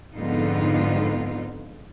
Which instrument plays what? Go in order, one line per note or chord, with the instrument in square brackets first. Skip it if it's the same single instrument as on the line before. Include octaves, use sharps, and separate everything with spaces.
[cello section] F2 G#2 D3 B3 D#4 F4